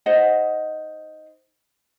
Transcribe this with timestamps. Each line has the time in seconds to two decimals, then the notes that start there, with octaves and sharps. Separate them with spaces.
0.06 D#4 C5 D#5 F#5